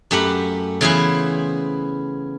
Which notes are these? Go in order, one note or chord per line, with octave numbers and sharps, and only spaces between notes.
F#2 A3 G4 F#5 B5
C#3 E3 B3 E4 B4 C5